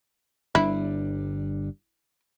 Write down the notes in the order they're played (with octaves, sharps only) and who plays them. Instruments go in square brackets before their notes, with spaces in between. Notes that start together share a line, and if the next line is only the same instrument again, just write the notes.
[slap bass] G1 G3 D4 [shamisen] E4